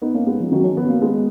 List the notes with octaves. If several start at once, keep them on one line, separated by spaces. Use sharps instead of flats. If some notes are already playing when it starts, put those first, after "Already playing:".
B3 D#4
A#3 C#4
G#3 B3
F3
D#3 F#3
C#4
B3
A#3
G#3 B3